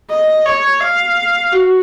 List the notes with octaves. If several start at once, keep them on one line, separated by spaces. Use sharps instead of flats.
D#5
C#5
F5
F#4